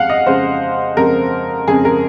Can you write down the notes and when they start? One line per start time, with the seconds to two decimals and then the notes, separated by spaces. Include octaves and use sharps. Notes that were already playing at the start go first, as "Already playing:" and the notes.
Already playing: F2 G#3 F5 F#5
0.10 D#5
0.27 F2 C#3 G#3 C5
0.97 F2 C#3 G#3 A#4
1.68 F2 C#3 G#3 G#4
1.85 A#4